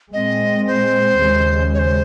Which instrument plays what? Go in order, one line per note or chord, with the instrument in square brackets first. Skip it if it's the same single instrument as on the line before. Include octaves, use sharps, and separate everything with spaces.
[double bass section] A#2 G#3 C4 [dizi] D#5
[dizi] C5
[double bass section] D#2 C#3 G#3
[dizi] C#5
C5